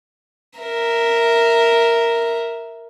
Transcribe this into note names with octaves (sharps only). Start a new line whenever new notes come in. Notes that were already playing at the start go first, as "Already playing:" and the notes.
A#4 E5